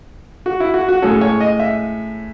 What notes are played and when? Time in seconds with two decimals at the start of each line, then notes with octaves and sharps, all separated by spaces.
0.46 F#4
0.60 E4
0.74 F#4
0.89 F#4
1.02 A2 G#3 C#4 A4
1.21 C#5
1.40 D#5
1.59 E5